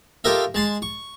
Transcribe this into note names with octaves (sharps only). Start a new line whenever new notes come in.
F4 G4 A4 A#4 D#5 E5
G#3 A5 C6
C#6